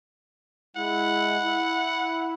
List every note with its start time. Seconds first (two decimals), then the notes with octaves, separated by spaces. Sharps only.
0.76 G#3 E4 F#5
1.44 E4